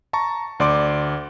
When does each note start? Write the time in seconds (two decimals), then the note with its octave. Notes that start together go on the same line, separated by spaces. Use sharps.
0.13 A5 A#5 C#6
0.60 D2 D5 C6 D6